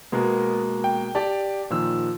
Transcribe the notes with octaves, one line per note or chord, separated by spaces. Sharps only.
B2 G#3 A#3 B3 A#4
G5
G4 D5 A5
A#2 D#3 F3 E6